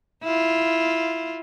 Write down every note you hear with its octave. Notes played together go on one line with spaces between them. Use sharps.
E4 F4